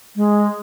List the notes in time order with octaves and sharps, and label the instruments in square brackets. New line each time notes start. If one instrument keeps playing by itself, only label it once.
[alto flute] G#3